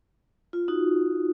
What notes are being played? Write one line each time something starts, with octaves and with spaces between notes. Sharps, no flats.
F4
D#4 F#4